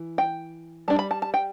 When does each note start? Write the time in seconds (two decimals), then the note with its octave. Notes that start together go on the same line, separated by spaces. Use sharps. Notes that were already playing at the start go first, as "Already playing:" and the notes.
Already playing: E3
0.18 G5
0.88 G3 D4 A5
0.99 B5
1.11 A5
1.22 A5
1.34 G5